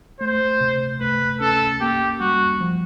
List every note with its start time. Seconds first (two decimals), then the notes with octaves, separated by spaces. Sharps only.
0.20 A3 C5
0.61 C3
1.01 A3 B4
1.41 C#4 A4
1.81 A#3 G4
2.20 G3 F#4
2.61 F3